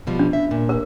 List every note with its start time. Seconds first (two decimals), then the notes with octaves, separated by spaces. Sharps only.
0.07 B2 F3 G3
0.19 D4
0.33 E5
0.51 A#2
0.69 A#4